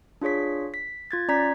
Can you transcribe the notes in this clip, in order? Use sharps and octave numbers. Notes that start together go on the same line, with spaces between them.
D4 F4 G#4 C#5 B6
B6
F4 G#6 A6
C#4 D5 A#5 G#6 B6